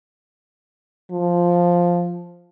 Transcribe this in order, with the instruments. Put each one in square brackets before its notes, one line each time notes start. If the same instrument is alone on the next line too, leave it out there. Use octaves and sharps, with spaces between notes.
[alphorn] F3